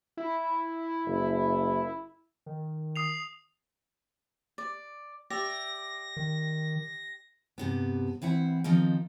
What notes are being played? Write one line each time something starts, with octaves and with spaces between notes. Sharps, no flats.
E4
F#1
D#3
D#6 C7 F7
D5
G4 D5 E5 A#6
D#3
G2 C3 B3
E3 C4 E4 F#5
D#3 F3 C4 D#4